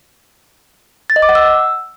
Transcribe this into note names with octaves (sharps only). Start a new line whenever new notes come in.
A6
D#5
D6
F#5
E6